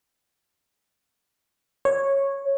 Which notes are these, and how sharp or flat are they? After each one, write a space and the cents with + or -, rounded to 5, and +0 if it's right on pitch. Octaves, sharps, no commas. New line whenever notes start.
C#5 -10